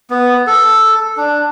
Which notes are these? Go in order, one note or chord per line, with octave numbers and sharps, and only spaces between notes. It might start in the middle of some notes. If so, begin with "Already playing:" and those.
B3
A4
D4